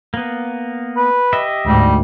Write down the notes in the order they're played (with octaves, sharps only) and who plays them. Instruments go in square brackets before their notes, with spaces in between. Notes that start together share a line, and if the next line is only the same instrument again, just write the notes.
[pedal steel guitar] A#3 B3
[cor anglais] B4
[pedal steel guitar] G4 D#5 E5
[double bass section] D2 G#2 [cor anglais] G3